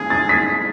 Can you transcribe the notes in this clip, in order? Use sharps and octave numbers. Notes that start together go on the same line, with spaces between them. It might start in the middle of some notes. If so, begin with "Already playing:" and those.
Already playing: G#4 G#6
A6
B6